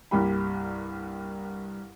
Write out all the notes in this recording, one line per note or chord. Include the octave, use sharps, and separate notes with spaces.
C2 G2 A#3 G4 B5